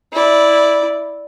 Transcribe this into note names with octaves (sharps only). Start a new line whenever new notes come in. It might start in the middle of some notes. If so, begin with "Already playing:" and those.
E4 D5